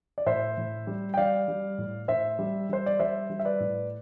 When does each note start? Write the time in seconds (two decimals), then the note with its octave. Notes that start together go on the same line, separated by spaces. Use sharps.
0.18 D5
0.26 A2 C5 E5
0.57 A2
0.87 G3
1.14 G5
1.17 G3 D5 F5
1.48 G3
1.78 A2
2.08 A2 C5 E5
2.39 G3
2.69 G3 C5
2.86 D5
2.99 G3 C5 E5
3.30 G3
3.39 E5
3.45 B4 D5
3.60 A2